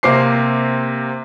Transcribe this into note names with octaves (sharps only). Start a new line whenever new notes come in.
C3 A#3 C4 D6 C7